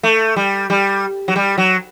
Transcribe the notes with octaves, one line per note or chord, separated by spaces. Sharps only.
A3
G3
G3
F#3
G3
F#3